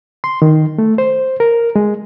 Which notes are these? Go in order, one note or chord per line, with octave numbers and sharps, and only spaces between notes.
C6
D#3
A3
C5
A#4
G#3